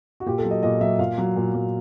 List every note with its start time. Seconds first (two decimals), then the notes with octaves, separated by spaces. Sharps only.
0.20 F#4
0.26 A#2 G4
0.38 A4
0.44 F#3
0.51 D#5
0.63 A#2 D#5
0.81 F#3 E5
0.99 A#2 F5
1.18 F#3
1.36 A#2
1.54 F#3